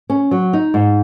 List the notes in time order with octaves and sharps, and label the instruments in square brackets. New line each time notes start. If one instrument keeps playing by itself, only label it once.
[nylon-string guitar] C#4
F#3
D#4
G#2